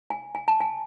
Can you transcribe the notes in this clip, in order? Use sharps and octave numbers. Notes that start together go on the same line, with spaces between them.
G#5
G#5
A5
G#5